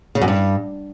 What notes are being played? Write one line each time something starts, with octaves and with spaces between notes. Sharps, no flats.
C#3
F#2
G2